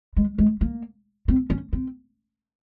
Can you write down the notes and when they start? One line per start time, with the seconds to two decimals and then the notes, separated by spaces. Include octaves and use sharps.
0.16 G#3
0.38 G#3
0.61 A#3
1.28 C4
1.50 C#4
1.73 C4